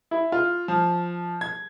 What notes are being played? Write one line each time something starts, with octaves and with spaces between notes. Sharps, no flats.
E4
F4
F3
G#6